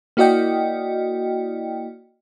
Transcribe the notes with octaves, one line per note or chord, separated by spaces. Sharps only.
A#3 E4 F#4 D5 D#5 G5